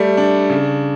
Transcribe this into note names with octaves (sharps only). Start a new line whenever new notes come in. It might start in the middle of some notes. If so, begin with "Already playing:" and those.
Already playing: G3 A3
D4
C#3